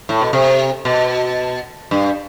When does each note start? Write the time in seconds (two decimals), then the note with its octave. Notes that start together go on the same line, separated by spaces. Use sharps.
0.09 A2
0.21 B2
0.33 C3
0.85 B2
1.91 G2